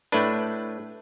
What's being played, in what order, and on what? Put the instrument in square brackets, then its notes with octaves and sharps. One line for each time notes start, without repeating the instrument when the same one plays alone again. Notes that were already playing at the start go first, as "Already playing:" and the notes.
[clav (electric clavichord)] A2 A3 D4 B4